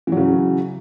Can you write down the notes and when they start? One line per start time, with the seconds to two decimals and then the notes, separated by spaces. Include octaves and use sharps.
0.07 E3
0.12 F#3
0.17 C#3